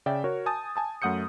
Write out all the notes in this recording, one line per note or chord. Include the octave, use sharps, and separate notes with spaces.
C#3 D5 E5 G5
F#4 A#4 C#5
G#5 A5 D#6 G6 A6
G#5 A5 D#6
F#2 A3 F#5 D#6 G6 C#7